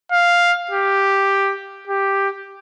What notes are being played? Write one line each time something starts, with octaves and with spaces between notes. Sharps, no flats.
F5
G4
G4